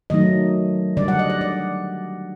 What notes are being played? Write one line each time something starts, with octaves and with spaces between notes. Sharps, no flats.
D#3 F#3 A3 D#4 D#5
D3 G3 D4 D5
F#5
D#5
D5
D5